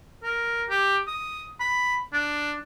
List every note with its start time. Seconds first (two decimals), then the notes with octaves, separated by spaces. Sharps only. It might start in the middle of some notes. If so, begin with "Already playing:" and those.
0.23 A#4
0.70 G4
1.07 D#6
1.60 B5
2.13 D4